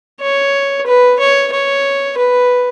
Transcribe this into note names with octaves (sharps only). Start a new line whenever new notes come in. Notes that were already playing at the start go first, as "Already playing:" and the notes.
C#5
B4
C#5
C#5
B4